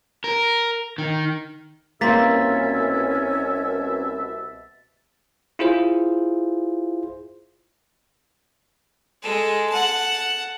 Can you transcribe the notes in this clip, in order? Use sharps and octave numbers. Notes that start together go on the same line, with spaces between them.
A#4
D#3
C2 B2 A#3 C4 C#4 E5 A6 B6
E4 F4 G#4 C5
G#3 A4
F#5 A5